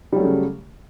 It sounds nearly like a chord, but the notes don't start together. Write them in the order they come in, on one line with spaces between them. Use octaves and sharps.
G3 F#3 A3 C#3